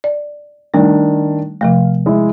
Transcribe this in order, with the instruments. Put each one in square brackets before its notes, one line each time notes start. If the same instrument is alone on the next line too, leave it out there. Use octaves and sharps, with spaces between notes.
[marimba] D5
[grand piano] D#3 D4 [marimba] G3 A3
[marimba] C3 F3 A3 [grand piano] F5
[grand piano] G#3 E4